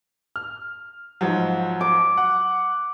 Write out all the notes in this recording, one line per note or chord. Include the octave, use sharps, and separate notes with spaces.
F6
G#2 F3 F#3
D6
F#5